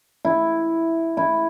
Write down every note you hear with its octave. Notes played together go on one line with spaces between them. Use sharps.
E4
E4